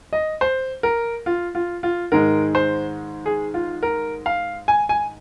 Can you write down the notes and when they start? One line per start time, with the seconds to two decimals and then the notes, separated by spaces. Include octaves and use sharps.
0.13 D#5
0.41 C5
0.83 A#4
1.26 F4
1.55 F4
1.83 F4
2.12 G#2 D#3 G#3 A#4
2.55 C5
3.26 G#4
3.54 F4
3.83 A#4
4.26 F5
4.68 G#5
4.89 G#5